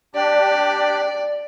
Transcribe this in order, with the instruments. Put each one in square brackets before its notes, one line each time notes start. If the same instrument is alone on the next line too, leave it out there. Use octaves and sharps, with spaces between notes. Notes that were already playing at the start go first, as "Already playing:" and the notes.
[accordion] D4 G4 [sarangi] D5